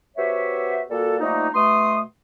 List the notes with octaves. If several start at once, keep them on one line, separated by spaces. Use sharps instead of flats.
B3 F#4 G4 C5 C#5 E5
A#2 G3 A#3 F#4 A4
F3 G3 A3 A#3 D#4
B2 A3 C6 D#6